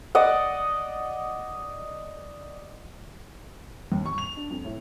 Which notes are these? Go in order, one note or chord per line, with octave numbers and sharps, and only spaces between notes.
D5 D#5 F#5
D#2
C#6
F7
D4
F2
A2